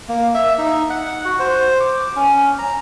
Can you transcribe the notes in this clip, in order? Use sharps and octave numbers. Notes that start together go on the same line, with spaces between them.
A#3
E5
D#4
F#5
F#4
C5
D6
C#4
A#5